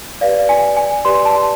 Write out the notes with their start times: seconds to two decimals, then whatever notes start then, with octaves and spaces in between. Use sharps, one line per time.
0.21 G4 B4 D5 F5
0.49 G#5
0.77 G#5
1.05 G4 B4 D5 C6
1.25 A5